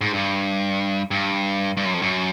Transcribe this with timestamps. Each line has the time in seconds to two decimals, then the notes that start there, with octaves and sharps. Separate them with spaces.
0.01 G#2
0.13 G2
1.11 G2
1.77 G2
1.85 F#2
1.94 F2
2.02 F#2